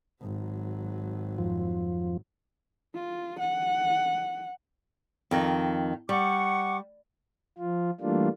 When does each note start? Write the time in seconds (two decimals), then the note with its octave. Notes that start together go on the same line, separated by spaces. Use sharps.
0.22 G#1 F#3
1.38 F2 F3
2.95 F4
3.39 F#5
5.31 F2 D#3 D#4
6.09 G3 F#5 C#6 D6
7.58 F3 F4
8.01 E3 G3 A3 A#3 D4 F4